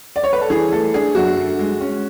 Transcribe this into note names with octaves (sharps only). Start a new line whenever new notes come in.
D5
C#5
B4
A4
E3 G#4
A3 A4
D4 G#4
F#2 F#4
D3
G#3
C#4